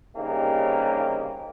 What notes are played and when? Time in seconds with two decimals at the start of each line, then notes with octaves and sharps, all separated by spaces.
0.15 C2 C#3 A#3 D#4 G4